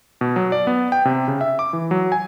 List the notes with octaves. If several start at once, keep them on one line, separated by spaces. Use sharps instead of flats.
B2
F#3
D5
B3
G5
C3
C#3
E5
D6
E3
F#3
G#5